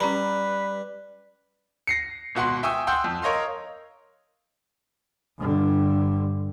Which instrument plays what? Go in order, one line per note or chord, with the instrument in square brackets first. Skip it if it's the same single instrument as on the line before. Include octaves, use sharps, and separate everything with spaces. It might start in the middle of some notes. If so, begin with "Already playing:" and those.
[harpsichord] G3 [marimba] C#4 A#5 B5 [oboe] B4
[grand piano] A#6 C7 C#7
G#1 B2 F#5 C6
E5 G5 G#5 C#6 D#6 E6
F#5 G5 C6 E6 G6
F2
A#4 C#5 D#5 F5 C6
[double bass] G2 D3